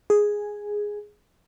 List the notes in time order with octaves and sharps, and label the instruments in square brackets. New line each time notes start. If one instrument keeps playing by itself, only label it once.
[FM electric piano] G#4